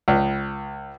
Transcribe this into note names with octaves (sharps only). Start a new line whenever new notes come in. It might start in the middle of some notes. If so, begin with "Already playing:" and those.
C#2